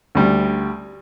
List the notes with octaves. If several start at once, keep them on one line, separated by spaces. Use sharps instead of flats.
D2 G3